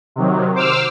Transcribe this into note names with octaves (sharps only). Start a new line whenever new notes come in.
C3 D#3 F#3
C5 D6 E6 F6